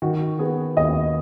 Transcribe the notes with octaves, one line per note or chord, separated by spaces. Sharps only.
D#3 F#4
B3 G#4
D#2 D#5